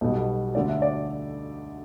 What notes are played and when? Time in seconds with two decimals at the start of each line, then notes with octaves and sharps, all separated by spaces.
0.01 B1 B2 G3 A4
0.55 D2 D3 A3 D5
0.69 E5
0.82 D5